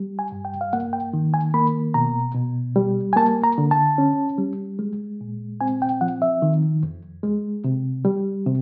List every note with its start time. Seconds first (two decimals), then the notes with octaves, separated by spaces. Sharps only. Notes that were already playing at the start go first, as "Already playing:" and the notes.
Already playing: G3
0.19 G#5
0.32 G2
0.45 G5
0.61 F5
0.73 A#3 F#5
0.93 G5
1.13 D#3
1.34 G#5
1.54 A#3 B5
1.94 B2 A#5
2.35 B2
2.76 G3
3.13 G#5
3.16 A#3 A5
3.43 A#5
3.58 D3
3.71 A5
3.98 C#4
4.38 G3
4.79 G#3
5.21 A#2
5.61 C4 G#5
5.82 G5
6.01 F3 F#5
6.22 E5
6.42 D#3
6.83 F2
7.23 G#3
7.64 C3
8.05 G3
8.46 C3